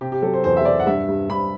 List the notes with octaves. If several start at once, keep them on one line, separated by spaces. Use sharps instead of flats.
C3 G4
G4
F#3 A4
C5
E2 C5
E5
C3 D5
F#5
G2 E5
G2
G2 B5